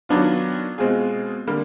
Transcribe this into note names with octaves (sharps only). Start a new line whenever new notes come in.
D#3 F#3 B3 D4 F4
B2 G#3 C4 F4 G#4
D3 G3 A#3